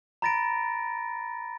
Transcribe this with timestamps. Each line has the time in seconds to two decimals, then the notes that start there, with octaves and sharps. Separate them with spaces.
0.22 A#5 B5 A6 A#6 D7